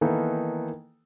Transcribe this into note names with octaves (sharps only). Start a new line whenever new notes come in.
D#3 E3 A#3 B3 D#4 A4